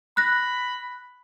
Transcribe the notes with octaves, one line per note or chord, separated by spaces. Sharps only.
B5 F#6 A#6